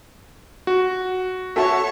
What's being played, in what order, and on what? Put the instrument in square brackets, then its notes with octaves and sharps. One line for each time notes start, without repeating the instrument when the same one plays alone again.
[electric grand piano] F#4
[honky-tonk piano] F#4 A4 E5 [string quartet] C#5 A5 C#6